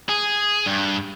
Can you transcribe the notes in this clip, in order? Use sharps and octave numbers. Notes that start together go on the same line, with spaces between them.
G#4
G2